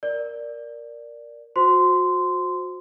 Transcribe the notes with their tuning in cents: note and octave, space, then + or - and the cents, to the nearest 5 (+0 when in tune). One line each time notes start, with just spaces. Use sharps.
A#4 +0 D5 +0
F#4 -30 C5 +0 C6 -15